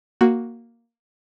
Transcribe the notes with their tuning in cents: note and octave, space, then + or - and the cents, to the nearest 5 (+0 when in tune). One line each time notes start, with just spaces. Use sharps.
A#3 +0 F#4 +0